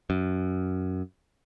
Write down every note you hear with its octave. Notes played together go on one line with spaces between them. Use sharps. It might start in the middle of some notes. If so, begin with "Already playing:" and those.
F#2